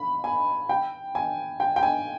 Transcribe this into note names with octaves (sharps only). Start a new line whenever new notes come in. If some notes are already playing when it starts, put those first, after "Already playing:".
Already playing: B5
G#5
G5
G#5
G5
G5
G#5